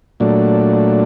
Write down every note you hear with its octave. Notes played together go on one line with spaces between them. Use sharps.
A#2 F#3 A3 D4